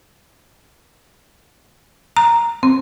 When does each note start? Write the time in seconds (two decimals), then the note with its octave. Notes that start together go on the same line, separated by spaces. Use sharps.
2.17 A#5
2.63 C4